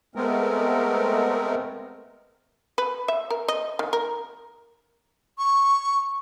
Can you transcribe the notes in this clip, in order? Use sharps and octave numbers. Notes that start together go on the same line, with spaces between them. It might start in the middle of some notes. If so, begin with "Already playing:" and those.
G#3 A3 B3 C4 A#4
B4
E5
A#4
D#5
D#3
A#4
C#6